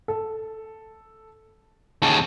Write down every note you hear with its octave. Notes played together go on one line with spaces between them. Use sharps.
A4
D#2 C#3 A5